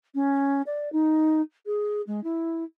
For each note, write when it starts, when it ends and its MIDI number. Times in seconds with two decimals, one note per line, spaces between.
0.15 0.62 61
0.66 0.91 74
0.92 1.41 63
1.66 2.02 68
2.07 2.20 56
2.24 2.64 64